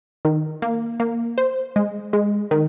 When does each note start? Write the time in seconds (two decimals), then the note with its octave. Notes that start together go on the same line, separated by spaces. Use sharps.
0.25 D#3
0.62 A#3
1.00 A#3
1.38 C5
1.76 G#3
2.13 G#3
2.51 D#3